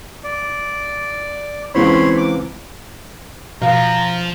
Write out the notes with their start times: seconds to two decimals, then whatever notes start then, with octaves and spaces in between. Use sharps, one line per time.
0.24 D5
1.75 C#2 E3 C4 C#5 B5 C6
2.17 D6
3.62 B2 F3 F5 A#5